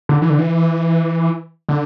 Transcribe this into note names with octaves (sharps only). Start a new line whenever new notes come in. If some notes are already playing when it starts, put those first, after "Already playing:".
D3
E3
D3
E3
D3